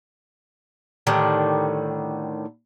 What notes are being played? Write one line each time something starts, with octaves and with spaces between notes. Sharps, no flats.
A2 D3 D#3 G3